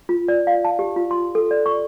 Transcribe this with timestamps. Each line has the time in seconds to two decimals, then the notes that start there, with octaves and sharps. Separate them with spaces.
0.09 F4
0.28 D5
0.47 F5
0.65 A5
0.79 G4
0.96 F4
1.11 C6
1.35 A4
1.51 D5
1.66 C#6